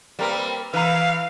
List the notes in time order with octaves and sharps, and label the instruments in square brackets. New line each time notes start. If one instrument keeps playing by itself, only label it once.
[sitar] G3 C4 [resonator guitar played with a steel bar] A#3 A#4 B4
[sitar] E3 [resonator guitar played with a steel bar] B4 A#5 [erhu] F5